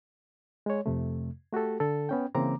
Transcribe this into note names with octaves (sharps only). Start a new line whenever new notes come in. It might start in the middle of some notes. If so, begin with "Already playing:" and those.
G#3 C#5
F2 C3 A3
A3 F#4 G4 A4
D3 A4
B3 C#4 G5
C#3 E3 A#3 C4 A#5 D6